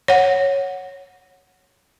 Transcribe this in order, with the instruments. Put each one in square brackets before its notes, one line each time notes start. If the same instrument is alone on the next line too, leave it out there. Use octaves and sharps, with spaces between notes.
[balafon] C#5 F#5